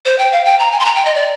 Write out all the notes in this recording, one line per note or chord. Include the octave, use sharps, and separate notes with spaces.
C5
G5
F5
G5
A#5
G#5
C6
A#5
G5
D#5
D5